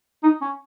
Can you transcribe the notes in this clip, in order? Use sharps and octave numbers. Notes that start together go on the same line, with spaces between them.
D#4
C#4